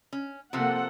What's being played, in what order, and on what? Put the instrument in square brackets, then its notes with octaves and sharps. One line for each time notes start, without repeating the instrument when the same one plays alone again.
[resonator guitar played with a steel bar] C#4
[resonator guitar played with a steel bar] C3 F3 C4 [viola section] A#3 A4 F#5